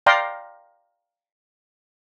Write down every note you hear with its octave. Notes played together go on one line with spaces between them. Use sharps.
D5 F5 G5 A#5 C6